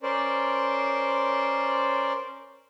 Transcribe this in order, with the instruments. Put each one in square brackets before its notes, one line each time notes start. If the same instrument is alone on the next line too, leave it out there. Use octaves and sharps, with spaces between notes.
[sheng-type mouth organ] C#4 A#4 C5 D5